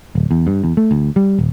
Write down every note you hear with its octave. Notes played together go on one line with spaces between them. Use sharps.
D1
E2
G2
E2
A3
D2
G3
D#1